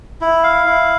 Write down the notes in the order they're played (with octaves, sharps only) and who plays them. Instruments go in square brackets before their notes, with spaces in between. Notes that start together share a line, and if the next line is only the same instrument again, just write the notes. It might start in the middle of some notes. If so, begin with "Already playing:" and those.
[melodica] E4
F5
E4